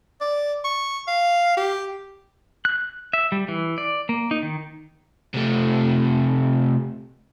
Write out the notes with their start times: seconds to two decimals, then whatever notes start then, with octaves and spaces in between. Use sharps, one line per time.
0.21 D5
0.64 C#6
1.07 F5
1.57 G4
2.65 F#6
3.13 E5
3.32 G3
3.48 E3
3.78 D5
4.09 A#3
4.31 D#4
4.43 D#3
5.34 C3 A3